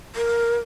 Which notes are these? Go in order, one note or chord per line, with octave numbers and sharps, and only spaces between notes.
A#4